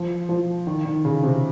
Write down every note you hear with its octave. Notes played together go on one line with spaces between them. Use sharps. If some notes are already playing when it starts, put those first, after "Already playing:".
Already playing: F3
F3
D#3
D#3
C#3
C3